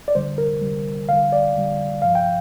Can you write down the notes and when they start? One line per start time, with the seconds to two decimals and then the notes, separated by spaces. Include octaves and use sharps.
0.08 D5
0.15 F2 D3 G3 C5
0.38 A#4
0.61 F2 D3 G3
1.09 F2 D3 G3 F5
1.33 D5
1.55 F2 D3 G3
2.02 G2 F3 F5
2.15 G5